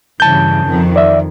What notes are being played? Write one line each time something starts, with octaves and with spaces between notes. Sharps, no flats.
G2 C#3 E3 A5 G6
F2 D#3
D5 E5